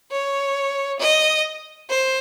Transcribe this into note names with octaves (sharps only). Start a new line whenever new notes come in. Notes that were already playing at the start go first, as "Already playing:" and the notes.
C#5
D#5
C5